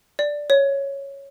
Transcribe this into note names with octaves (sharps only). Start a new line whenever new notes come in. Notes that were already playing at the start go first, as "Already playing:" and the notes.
D5
C#5